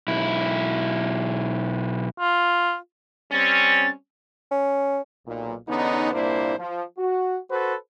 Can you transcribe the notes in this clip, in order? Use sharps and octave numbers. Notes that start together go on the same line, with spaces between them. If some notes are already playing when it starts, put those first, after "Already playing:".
B1 E4
F4
G3 C4 C#4 A6
C#4
B1 A#2
E2 D3 B3 C#4 D#4
C2 A#2 A#3 D4 E4 C5
F3
F#4
F#4 A4 B4 C5